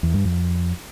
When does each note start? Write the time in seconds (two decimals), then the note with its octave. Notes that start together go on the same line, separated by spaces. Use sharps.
0.03 E2
0.14 G2
0.25 F2